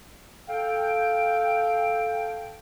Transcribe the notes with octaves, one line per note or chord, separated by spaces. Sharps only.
A4 F5 G5